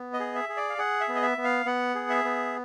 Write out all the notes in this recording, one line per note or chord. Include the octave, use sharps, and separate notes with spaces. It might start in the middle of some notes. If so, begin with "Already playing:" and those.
Already playing: B3
D#5
G#4
E5
G#4
D5
F5
G#4 F#5
E5
B3
D#5
E5
B3
F5
B3 F#5
G#4
E5
B3